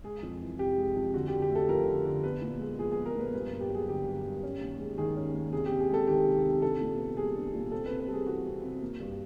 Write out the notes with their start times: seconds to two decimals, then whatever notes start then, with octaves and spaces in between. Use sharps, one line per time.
0.04 G#3 G#4
0.23 F2
0.41 E3
0.59 C3 G4
0.78 G#3
0.96 F2
1.14 D3 F#4
1.28 G4
1.33 D3
1.42 G4
1.50 A3
1.55 A4
1.69 F3 A#4
1.87 D3
2.05 D3
2.23 B3 B4
2.42 A#2
2.60 G#3
2.79 F3 G#4
2.92 G#4
2.96 B3
3.06 A#4
3.15 A#2 B4
3.33 G2 B4
3.47 A#4
3.52 G2
3.60 G4
3.69 F#3
3.74 G#4
3.88 D3 G4
4.06 G2
4.25 G2
4.43 C#4
4.61 D#2
4.80 G#3
4.98 D#3 G#4
5.16 C#4
5.34 D#2
5.53 C3 G#4
5.66 G4
5.71 C3
5.80 G#4
5.89 G#3 A4
6.07 D#3 G4
6.26 C3
6.44 C3
6.62 D4 A4
6.81 A#2
6.98 B3
7.17 G3 G#4
7.36 D4
7.54 A#2
7.72 C4 A4
7.86 C3 B4
8.00 B4
8.08 G3 A4
8.13 G#4
8.26 E3 F#4
8.44 C4
8.63 C3
8.81 A#3
9.00 G2